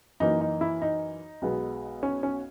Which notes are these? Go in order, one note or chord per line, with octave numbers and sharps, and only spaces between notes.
F#2 E3 A#3 D#4
D#4
E4
D#4
B1 B2 G#3 B3
C#4
C#4